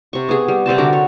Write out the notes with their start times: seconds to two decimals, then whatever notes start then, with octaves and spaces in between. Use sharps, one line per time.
0.13 C3 C#6
0.29 B3 G#4
0.48 G3
0.66 C3 G3 C4 A5
0.78 D3 F#4 A#4 D6
0.93 C#5